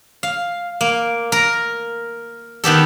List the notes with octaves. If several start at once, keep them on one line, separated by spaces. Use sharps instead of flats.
F5
A#3
A#4 A#5
D#3 B3 G4 A4